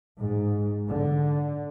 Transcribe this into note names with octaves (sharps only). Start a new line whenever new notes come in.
G#2
D3